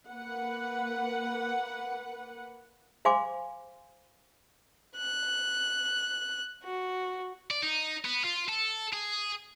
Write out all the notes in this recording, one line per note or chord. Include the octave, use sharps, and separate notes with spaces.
A#3 B4 F#5
C5 F5 G#5 C6 D6
F#6
F#4
D5
D#4
B3
F4
A4
G#4